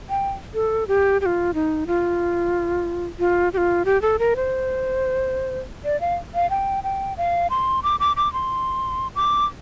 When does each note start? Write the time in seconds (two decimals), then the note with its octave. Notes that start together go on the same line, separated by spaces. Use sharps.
0.10 G5
0.54 A4
0.88 G4
1.21 G4
1.26 F4
1.54 D#4
1.87 F4
3.19 F4
3.53 G4
3.57 F4
3.85 G4
4.02 A4
4.19 A#4
4.36 C5
5.84 D5
6.01 F5
6.35 F5
6.50 G5
6.84 G5
7.17 F5
7.50 C6
7.83 D6
8.00 D6
8.16 D6
8.33 C6
9.16 D6